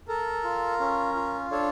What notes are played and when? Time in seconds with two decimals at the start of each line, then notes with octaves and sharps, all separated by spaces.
0.08 A4 A#4
0.44 F4
0.80 C#4
1.16 F4
1.51 D4 A4 C#5